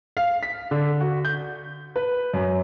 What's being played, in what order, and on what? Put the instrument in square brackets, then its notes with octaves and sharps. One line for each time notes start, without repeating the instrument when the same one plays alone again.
[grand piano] F5
B6
D3
F#4
G6
B4
F#2